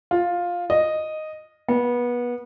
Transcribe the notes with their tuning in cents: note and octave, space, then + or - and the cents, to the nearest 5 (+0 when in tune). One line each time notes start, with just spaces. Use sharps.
F4 +10
D#5 -5
B3 -25